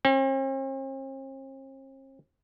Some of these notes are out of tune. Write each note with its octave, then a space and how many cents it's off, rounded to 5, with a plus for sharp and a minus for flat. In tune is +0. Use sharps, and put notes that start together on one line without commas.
C4 +45